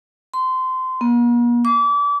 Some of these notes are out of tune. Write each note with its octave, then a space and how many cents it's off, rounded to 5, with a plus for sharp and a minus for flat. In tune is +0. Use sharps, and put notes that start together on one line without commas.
C6 -20
A#3 +45
D6 -30